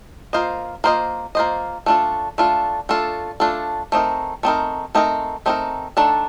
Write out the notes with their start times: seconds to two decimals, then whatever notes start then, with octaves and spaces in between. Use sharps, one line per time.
0.33 A#3 F4 C5 D#5
0.84 A#3 F4 C5 D#5
1.35 A#3 F4 C5 D#5
1.86 A3 D4 F4 A4
2.38 A3 D4 F4 A4
2.89 A3 D4 F4 A4
3.40 A3 D4 F4 A4
3.92 A3 C4 D#4 A#4
4.43 A3 C4 D#4 A#4
4.95 A3 C4 D#4 A#4
5.46 A3 C4 D#4 A#4
5.97 D#3 A3 D4 A4